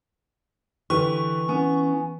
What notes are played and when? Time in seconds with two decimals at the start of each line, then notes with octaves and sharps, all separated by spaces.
0.90 D3 E3 G4 B4 C#6
1.49 B3 C#4